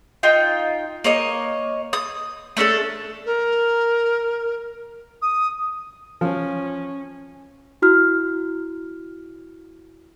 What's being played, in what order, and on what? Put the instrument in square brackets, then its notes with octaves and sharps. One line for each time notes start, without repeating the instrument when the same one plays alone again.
[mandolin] D#4 F4 G5
A#3 C#5 D#5
D#6
A3 C#4 D4 A4
[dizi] A#4
D#6
[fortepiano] F3 [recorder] C#4
[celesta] E4 F#4 F6